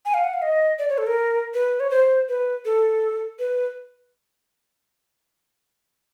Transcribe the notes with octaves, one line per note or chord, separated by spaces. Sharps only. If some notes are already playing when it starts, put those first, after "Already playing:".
G#5
F5
F#5
F5
D#5
D5
C#5
A4
A#4
B4
C#5
C5
B4
A4
B4